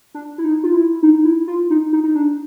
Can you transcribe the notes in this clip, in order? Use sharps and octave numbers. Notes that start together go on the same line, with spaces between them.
D4
E4
D#4
F4
E4
D#4
E4
F4
D#4
D#4
D#4
D4